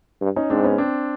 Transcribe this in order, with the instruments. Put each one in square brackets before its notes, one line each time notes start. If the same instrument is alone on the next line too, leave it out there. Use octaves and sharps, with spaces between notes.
[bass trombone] G2
[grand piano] C#4 D#4
[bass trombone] G#2 [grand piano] C4 D4
[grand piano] B3 C#4
C4 D4